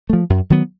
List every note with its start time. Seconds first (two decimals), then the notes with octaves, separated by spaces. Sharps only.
0.10 F3 A3
0.30 F#2
0.50 D#3 F#3 B3